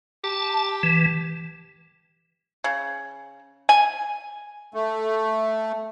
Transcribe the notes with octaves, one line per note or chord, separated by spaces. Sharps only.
G4 A5
E3
C#3
G#5
A3